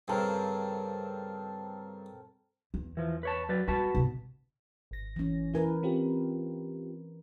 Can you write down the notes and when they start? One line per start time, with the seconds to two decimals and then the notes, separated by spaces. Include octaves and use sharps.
0.08 G2 C#3 C4 A4 A#4
2.74 E2
2.97 E3 F3
3.23 B4 C#5 A5
3.49 F#3 B4 D5
3.68 G3 F#4 B4 A5
3.95 C3 D#3
4.91 G#1 A#6
5.16 E3 C#4
5.54 E3 E4 A#4 B4 G#5
5.83 C4 F4 G4